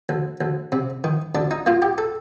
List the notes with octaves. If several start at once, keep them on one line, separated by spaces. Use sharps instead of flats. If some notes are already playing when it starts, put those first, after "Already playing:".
D2
D2
C3
D#3
D2 D4
D#4
A#3 F4
G4
A4